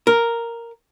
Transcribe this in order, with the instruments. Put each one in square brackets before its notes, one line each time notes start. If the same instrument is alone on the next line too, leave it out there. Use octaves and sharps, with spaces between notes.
[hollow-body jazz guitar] A#4